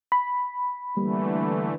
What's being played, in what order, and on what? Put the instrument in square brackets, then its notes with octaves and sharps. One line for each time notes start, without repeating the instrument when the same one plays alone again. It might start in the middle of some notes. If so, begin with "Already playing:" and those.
[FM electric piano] B5
[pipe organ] D3 E3 A3 [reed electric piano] G3 A#3